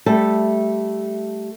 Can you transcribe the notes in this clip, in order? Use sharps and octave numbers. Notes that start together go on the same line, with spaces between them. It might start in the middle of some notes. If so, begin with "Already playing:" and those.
G3 A3 A4